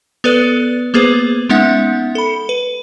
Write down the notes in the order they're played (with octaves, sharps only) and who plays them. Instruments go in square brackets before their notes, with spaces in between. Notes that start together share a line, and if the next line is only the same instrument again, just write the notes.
[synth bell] B3 A4 B4 D5 F#6
A#3 B3 G#4 B4 C5
G#3 B3 C#4 D#4 E5 F#5
A4 B5
B4